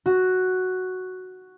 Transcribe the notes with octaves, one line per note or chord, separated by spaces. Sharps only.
F#4